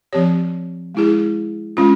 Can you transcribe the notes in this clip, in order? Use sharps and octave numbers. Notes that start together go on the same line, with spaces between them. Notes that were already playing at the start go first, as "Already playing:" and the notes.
F3 C4 G4 C#5
G#3 E4 G#4
G#3 C#4 F4